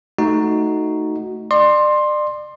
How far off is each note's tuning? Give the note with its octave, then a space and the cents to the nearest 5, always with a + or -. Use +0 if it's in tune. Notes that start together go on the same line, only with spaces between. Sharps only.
A3 +0 D#4 +0 F#4 +0
D5 +35 C6 +10